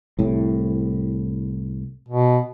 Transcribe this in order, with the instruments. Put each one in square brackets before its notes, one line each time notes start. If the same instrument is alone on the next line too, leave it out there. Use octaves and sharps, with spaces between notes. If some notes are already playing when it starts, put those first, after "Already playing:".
[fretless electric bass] C2 A2
[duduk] B2